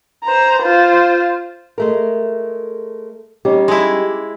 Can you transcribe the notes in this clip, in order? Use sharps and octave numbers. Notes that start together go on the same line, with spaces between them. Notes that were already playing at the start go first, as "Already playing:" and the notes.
C5 A#5
F4 C5
G#3 A3 A#4
G3 C#4 D#4 G4
G#3 E4